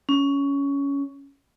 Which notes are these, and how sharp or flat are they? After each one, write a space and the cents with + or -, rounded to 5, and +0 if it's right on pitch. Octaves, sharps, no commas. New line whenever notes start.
C#4 +15